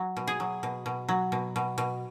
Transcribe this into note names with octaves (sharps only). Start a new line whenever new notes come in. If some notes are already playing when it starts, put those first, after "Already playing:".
Already playing: F#3
B2
G#4
F#3
B2
B2
F#3
B2
B2
B2